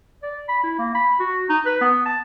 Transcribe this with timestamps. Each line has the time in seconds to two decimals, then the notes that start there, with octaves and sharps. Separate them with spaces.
0.23 D5
0.48 B5
0.64 E4
0.79 A#3
0.95 B5
1.20 F#4
1.49 D#4
1.66 B4
1.81 B3
2.05 A5